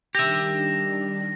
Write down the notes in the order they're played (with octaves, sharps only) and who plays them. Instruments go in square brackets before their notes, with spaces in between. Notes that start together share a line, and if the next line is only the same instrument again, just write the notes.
[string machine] D#3 G3 D4 [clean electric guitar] G4 E5 [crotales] A#6